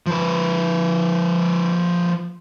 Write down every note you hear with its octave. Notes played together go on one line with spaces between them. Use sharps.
F3 B4